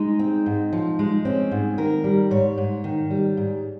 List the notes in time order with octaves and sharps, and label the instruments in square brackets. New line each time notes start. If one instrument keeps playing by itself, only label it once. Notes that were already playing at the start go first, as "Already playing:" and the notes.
Already playing: [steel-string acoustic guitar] G#3 D#4
C4
G#2
F3
G#3
C4 C#4
G#2
D#3 A#4
G3
G#2 C#5
G#2
D#3
G3
G#2